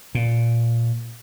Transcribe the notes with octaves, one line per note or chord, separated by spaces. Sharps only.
A#2